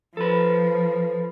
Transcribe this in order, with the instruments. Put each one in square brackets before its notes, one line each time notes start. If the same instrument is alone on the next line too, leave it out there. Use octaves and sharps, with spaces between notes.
[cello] F3 [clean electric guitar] A4 B4